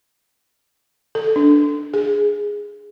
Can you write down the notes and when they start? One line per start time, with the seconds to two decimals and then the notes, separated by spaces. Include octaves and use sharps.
1.15 A4
1.36 D4
1.94 G#4